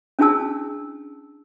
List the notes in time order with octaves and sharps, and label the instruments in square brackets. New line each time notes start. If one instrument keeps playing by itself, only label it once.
[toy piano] C#4 D4 E4 G#4 A5 E6